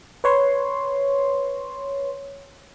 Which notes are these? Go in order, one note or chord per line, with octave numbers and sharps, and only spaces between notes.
B4 C#5 C6